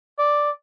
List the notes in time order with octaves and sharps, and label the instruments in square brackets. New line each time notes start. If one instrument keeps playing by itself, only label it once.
[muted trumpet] D5